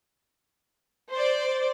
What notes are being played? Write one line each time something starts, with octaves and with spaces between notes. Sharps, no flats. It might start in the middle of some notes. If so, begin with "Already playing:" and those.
C5 D5